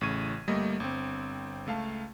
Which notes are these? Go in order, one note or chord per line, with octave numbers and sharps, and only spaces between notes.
A1 A2 C#3 C#6 G#6 D#7
G1 G3 A3 A#3 D#5
G1 C4
C#2 A3 F5 A5